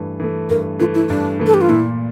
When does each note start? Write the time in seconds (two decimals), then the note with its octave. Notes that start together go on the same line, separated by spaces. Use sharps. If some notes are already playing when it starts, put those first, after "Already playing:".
Already playing: G2 E3 A3
0.20 E3 A3
0.50 G2 A#4
0.79 E3 A3 F4
0.94 E4
1.10 G2 D4
1.39 E3 A3
1.46 A4
1.54 G4
1.61 F4
1.69 A#2 E4